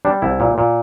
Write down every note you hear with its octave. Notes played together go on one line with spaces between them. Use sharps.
G3 D4
C2 E4
A#2
A#2